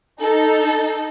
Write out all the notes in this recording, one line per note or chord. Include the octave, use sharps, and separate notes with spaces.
D#4 A4